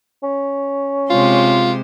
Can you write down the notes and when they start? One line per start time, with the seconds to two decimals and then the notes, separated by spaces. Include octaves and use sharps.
0.23 C#4
1.10 C3 G#3 F4 C5